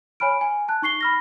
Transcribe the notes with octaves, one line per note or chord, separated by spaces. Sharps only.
C#5 G#5 B5 F6 D7
G#5
A5 F#6
D#4 C#6 C7 G7
B5 F6 A#6